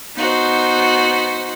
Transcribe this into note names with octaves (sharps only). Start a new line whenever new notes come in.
B3 D#4 F#4 C5